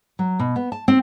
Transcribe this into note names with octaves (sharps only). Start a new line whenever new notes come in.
F#3
B2
B3
A5
C4